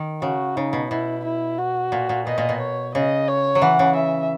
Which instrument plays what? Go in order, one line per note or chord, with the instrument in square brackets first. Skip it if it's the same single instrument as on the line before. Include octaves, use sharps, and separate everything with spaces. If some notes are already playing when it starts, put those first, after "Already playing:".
Already playing: [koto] D#3
[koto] C#3 [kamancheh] F#4
[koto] C#3 [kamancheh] D#4
[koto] B2
[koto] B2 [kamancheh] E4
[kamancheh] E4
F#4
[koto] A#2
A#2
[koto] B2 [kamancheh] D#5
[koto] A#2
B2
[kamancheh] C#5
[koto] C#3 [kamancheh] D#5
[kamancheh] C#5
[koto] F#3
[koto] E3 [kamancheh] F#5
[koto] C#3
[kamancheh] E5